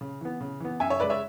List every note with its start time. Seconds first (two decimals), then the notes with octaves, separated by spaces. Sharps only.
0.01 C#3
0.21 E3 B3
0.41 C#3
0.60 E3 B3
0.80 F#2 E5 G#5
0.90 C#5 E5
1.00 C#3 G#3 B4 D5
1.10 C#5 E5